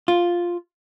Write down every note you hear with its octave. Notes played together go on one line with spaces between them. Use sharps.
F4